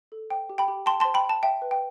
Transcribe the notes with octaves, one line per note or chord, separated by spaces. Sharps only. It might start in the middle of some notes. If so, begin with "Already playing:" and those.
A4
C5 G5
G4
G5 B5
G4
G5 A5 C6
C5 A5 C6
G5 B5
G5 A5
E5 G5
B4
G5